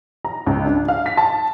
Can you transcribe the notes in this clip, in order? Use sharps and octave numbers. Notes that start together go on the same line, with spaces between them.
A#5
C#2
D4
F5
B6
A5